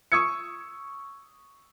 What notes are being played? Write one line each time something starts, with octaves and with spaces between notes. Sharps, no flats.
C#6 D#6 E6 G#6 C#7